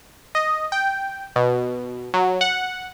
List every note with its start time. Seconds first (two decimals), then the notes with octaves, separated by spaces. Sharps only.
0.35 D#5
0.72 G5
1.36 B2
2.14 F#3
2.41 F#5